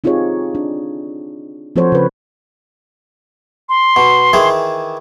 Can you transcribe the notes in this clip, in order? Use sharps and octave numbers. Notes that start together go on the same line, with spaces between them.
C4 D#4 F4 G4 G#4 C#5
D4
F3 C4 F#4 A4 C5 C#5
C#3 B4
C6
B2
D#3 E3 G#4